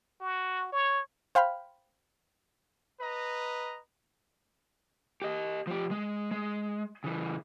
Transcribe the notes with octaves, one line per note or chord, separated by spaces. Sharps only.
F#4
C#5
C5 F5 G5 B5 F6
B4 D#5 A#5
G4 D#5
F3 G4
G#3
G#3
C#3 E3